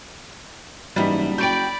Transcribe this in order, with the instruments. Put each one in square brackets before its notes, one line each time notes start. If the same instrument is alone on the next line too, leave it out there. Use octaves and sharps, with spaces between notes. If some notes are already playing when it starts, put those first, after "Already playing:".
[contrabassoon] F#1 [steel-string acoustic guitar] G#2 E3 [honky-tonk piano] G3 D#4
[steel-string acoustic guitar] F#4 G5 [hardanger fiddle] D5 B5 [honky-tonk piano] G6 D7